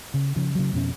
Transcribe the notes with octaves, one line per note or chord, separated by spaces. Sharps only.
C#3
C#3 F3
C#3 F#3
F2 B2 C#4